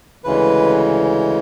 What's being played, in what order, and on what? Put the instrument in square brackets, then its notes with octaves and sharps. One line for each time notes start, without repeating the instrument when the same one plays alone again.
[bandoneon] D2 C#3 E3 G#3 B4